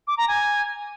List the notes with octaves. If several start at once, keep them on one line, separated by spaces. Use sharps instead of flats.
D6
A#5
G#5